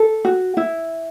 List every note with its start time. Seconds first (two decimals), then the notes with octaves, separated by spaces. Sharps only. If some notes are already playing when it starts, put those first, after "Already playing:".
Already playing: A4
0.25 F#4
0.57 E4